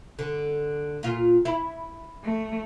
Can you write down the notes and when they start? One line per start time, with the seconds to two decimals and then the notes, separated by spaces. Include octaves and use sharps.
0.19 D3
1.03 A#2 F4
1.45 E4
2.25 A3